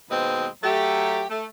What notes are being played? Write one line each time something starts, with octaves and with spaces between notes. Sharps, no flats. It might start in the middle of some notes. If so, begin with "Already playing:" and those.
D#2 B2 G#3 C4 B4 D#5
F#3 A3 G4
A3